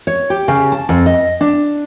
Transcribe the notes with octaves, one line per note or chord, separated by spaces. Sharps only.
C#5
G4
C#3
A5
F2
D#5
D4